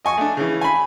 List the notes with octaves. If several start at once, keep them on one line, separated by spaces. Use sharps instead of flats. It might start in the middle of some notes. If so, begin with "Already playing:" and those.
D#5 G#5 C#6
A3 D4
C#3 E3
G#5 B5